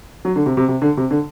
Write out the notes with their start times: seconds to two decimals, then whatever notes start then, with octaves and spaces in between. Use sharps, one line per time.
0.25 F#3
0.36 D3
0.46 C3
0.57 C3
0.68 C3
0.82 D3
0.97 C3
1.11 D3